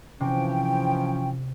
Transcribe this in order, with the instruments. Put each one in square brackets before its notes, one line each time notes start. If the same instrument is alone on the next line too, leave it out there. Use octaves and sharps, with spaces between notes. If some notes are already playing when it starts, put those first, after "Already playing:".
[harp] C3 [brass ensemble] E3 F3 [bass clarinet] C#4 [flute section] G5